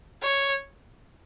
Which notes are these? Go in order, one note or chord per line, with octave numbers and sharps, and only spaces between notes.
C#5